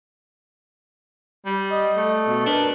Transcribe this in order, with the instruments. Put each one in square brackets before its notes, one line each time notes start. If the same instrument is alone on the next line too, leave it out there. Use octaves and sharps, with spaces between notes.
[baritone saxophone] G3
[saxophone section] D#5
[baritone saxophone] A3
[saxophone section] B2
[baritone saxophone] D4 [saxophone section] A#4 B4